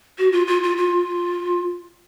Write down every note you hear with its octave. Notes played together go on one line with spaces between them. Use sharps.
F#4
F4
F4
F4
F4